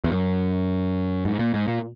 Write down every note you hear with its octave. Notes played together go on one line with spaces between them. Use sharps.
E2
F#2
G#2
A#2
G#2
A#2